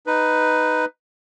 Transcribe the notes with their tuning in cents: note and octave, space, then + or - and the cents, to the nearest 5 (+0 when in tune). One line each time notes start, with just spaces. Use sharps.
D#4 +0 B4 +5